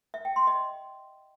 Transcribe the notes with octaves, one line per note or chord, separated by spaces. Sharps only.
E5
G5
C6
D#5